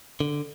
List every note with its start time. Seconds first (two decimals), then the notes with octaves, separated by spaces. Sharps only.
0.20 D3